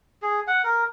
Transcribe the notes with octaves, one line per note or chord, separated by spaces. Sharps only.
G#4
F#5
A#4